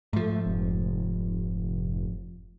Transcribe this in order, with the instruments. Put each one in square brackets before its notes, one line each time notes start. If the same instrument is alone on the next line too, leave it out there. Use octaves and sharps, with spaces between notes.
[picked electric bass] G#2 F3 [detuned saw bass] A3
[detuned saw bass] F1